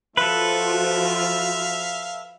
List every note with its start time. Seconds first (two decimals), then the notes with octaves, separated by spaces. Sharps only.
0.17 F3 F4 F#4 A4 B4 E5 F5